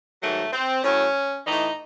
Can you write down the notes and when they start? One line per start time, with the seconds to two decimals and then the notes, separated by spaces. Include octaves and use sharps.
0.22 G#2 D#3 F#3 A3
0.53 C4
0.84 A2 F#3 C#4
1.47 A2 E3 D#4